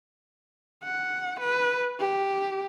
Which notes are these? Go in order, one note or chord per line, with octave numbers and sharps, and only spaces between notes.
F#5
B4
G4